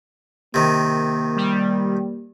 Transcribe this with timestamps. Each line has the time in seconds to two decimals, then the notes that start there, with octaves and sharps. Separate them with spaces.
0.54 C3 D#3 A#3
1.37 G3